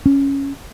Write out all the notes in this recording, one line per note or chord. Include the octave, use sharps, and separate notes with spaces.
C#4